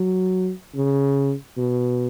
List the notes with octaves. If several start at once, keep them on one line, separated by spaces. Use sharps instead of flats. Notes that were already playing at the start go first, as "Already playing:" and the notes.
Already playing: F#3
C#3
B2